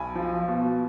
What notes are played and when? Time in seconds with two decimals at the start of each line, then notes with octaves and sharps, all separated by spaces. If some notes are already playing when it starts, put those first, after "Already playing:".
Already playing: B1 G#5 B5
0.15 F3
0.48 B2